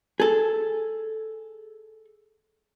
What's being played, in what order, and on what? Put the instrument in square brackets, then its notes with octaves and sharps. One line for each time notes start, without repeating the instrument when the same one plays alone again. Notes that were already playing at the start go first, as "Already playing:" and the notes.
[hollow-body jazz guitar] G#4 A4